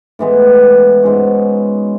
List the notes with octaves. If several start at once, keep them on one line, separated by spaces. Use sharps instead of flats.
A2 E3 G#3 B3
G#2 G#3 C#4 F#4